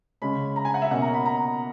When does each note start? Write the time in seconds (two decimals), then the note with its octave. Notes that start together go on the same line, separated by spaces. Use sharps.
0.22 C#3 G#3 C#4 B5
0.56 A#5
0.65 G#5
0.74 F#5
0.82 E5
0.91 B2 A#3 C#4 F#5
1.02 A#5
1.14 B5
1.26 A#5